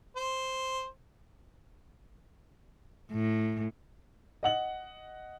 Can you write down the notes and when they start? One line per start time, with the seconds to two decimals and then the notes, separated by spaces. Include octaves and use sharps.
0.16 C5
3.12 A2
4.43 D#5 F#5 F#7